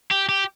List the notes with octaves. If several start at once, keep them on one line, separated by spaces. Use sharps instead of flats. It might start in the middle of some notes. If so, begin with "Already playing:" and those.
G4
G4